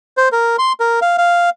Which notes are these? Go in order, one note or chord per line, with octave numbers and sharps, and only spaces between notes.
C5
A#4
C6
A#4
F5
F5